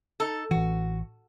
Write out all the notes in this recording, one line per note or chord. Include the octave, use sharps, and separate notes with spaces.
D#4 A4
A1 E3 F#4